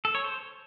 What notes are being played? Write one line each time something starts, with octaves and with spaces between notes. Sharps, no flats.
A4
C#5
C5